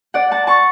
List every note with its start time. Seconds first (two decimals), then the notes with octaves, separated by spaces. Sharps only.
0.14 D5 F#5
0.31 F#5 A5
0.47 A5 C#6